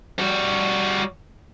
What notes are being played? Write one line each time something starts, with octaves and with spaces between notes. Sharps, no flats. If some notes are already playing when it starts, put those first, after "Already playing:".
G3 F#4